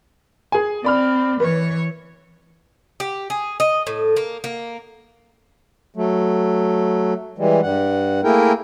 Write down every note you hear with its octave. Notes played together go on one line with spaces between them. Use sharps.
G#4 G#5
C4 D5 B5 F6
E3 B4 C#5
G4
G#4
D#5
A2
A#3
A#3
F#3 A3
E3 G3 G#3
G2 G3 F#5
A3 A#3 E4 G#4 A#4 G5